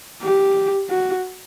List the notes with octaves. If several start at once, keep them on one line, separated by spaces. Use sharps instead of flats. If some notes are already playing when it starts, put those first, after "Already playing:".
G4
F#4